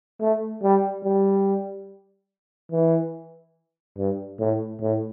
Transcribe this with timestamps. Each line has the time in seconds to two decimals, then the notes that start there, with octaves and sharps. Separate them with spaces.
0.21 A3
0.63 G3
1.04 G3
2.71 E3
3.97 G2
4.39 A2
4.81 A2